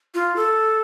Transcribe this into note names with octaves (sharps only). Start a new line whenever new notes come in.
F4
A4